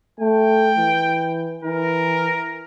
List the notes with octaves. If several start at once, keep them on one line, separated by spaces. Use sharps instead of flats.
A3 G5
E3
E3 A#4